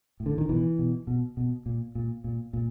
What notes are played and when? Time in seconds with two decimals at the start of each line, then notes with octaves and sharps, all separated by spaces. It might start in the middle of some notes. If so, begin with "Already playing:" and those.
0.20 A2
0.26 D3
0.38 D#3
0.49 B2 E3
0.79 B2
1.07 B2
1.37 B2
1.66 A#2
1.95 A#2
2.24 A#2
2.53 A#2